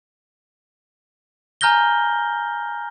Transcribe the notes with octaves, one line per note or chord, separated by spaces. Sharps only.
G#5 A#5 F6 G6 A#6 G7